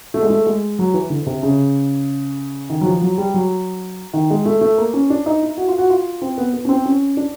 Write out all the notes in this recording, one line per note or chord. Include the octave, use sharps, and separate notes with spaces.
A3
G#3
A3
G#3
F#3
E3
D3
C3
C#3
D#3
F#3
F3
F#3
G3
F#3
D#3
G#3
A3
A3
A#3
C#4
D4
D#4
E4
F#4
F4
F#4
F4
C4
B3
B3
C#4
C4
C#4
D4